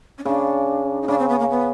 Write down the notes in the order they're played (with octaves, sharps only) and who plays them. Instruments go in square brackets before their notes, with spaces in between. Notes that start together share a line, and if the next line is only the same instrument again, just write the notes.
[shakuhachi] C#4
[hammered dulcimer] C#3 [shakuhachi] D4
[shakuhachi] D#4
[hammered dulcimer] C#3 [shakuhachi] D4
[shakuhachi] C4
B3
A#3
B3